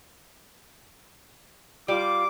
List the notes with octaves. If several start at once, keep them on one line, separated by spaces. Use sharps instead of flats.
G3 F4 D6